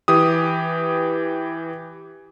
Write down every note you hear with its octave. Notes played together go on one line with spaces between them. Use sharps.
E3 G4 D#6